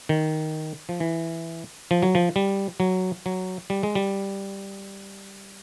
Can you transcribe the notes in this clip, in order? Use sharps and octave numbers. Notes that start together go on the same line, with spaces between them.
D#3
F3
E3
F3
F#3
F3
G3
F#3
F#3
G3
G#3
G3